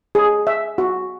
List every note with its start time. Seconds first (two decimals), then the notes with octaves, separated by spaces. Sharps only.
0.15 G#4
0.47 E5
0.78 F#4